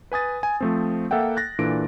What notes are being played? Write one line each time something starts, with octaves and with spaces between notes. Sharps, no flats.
B4 G#5 D#6 A6
G#5
F3 A3 C4
A#3 A4 E5 F#5 G5
F#6 A6 A#6
A#2 E3 D4 A4 D7